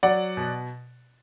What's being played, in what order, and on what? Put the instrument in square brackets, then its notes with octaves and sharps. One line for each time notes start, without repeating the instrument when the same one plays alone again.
[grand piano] F#3 D5 F#5
B2